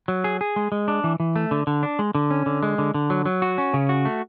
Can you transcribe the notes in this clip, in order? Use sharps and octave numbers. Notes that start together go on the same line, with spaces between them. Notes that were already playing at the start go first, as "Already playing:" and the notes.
F#3
G#4
G#4
G#3
G#3
D4
E3
E3
A3
D3
D3
D4
G#3
D3
C#4
D3
G#3
D3
D3
F#3
F#3
F#4
C#4
C#3
F#4
A3